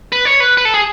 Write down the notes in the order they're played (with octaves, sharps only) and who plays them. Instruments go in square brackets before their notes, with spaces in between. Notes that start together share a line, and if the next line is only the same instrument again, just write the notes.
[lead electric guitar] B4
C#5
B4
B4
A4
G#4